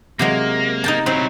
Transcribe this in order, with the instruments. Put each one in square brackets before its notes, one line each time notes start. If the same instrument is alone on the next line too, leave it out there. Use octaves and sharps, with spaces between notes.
[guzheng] C3 F#3 G#3 [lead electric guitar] A#3
[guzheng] D#4 G5 A5
[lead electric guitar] F#3 E4 [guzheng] C4 D#4